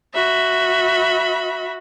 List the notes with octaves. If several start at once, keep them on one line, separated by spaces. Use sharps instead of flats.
F#4 E5 B5